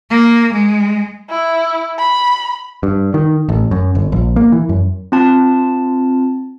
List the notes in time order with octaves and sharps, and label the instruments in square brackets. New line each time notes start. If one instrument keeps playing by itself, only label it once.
[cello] A#3
G#3
[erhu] E4
B5
[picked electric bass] G2
D#3
A1
F#2
G1
A#1
A#3
E3
F#2
[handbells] C4 F4 A5